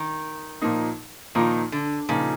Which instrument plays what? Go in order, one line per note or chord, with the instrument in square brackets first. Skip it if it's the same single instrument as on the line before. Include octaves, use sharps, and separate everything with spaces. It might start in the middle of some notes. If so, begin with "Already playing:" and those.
Already playing: [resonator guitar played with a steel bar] D#3
[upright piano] A#2 F3 A#3 D#4
[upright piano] A#2 F3 A#3 D#4 [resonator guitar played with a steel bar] D#3
[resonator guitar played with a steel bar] D3
[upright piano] A#2 F3 A#3 D#4 [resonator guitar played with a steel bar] C#3